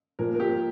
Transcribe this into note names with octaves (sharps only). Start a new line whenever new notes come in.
A#2 F3 A#4
A#4
G4